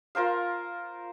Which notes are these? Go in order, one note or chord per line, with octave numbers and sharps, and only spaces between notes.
F4 A#4 C5 F5